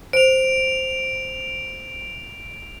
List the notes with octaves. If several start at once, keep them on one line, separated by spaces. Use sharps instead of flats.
C5 D7 F7